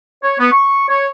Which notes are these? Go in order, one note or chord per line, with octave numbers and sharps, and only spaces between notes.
C#5
B3
C#6
C#5